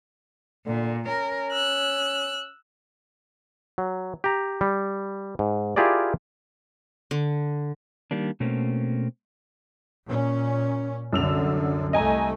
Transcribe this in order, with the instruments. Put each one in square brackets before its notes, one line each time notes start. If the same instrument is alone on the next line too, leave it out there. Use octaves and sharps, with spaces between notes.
[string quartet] A#2 [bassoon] D3
[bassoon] C#4 [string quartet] A#4
[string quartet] E6 F#6
[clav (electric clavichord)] F#3
G4 A#5
G3
G#2
E4 F4 G4 G#4 A#4 D5
[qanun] D3
[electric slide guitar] D#3 G3 A#3 D4
B2 A3 A#3 C4 C#4
[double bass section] A#2 C#4
[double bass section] C2 D3 [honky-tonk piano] F#2 E6 F7
[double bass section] C2 A3 [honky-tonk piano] D#5 G#5 A#5